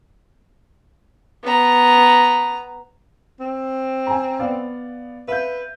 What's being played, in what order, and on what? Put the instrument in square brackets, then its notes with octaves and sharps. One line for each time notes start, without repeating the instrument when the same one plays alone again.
[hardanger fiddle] B3 A#5
[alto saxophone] C4
[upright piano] G#5 A#5
B3 D5 F5
[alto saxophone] B4 [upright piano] E5 F5 G6